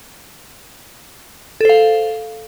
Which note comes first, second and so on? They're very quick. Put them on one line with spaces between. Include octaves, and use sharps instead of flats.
A4 C5 F5